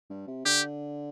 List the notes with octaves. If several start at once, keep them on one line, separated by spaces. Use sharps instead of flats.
G2
C3
D3 G4